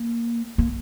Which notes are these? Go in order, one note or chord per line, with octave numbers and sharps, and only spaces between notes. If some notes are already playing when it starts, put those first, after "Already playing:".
Already playing: A#3
A#3